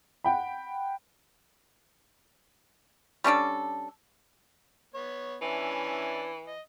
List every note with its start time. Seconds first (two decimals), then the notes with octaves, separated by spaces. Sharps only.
0.24 F#5 G5 B5
3.24 G3 C#4 D4 A4
4.95 B3 C#5
5.42 E3 C#4 D4 E4
6.47 D#5